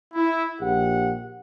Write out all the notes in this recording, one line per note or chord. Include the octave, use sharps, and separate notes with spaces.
E4
A#1 G4 F#5